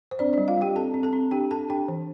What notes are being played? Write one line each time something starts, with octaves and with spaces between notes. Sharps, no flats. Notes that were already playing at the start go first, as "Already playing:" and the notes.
C5
C4 D4 D5
G3 D4 D5
F4 F5
G3 G4 G5
C4 A4 A5
C4
A4 A5
C4
D4 G4 G5
D4 A4 A5
D4 G4 G5
E3